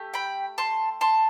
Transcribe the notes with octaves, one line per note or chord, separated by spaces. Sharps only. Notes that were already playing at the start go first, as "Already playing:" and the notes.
Already playing: A3 G4
G5 B5
A5 C6
A5 C6